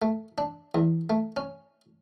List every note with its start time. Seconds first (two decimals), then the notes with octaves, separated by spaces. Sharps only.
0.02 A3
0.38 D4
0.75 E2
1.10 A3
1.37 C#4